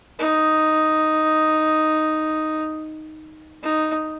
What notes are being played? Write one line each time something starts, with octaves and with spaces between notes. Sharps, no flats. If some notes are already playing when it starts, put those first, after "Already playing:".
D#4
D#4